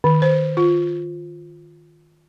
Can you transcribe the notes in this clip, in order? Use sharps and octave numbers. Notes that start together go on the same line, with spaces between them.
D#3
C5
F4